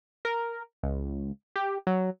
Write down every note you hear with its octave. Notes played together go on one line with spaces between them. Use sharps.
A#4
C#2
G4
F#3